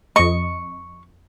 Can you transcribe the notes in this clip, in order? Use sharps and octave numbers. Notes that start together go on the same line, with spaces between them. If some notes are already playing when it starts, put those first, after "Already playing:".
F2 D#5 C#6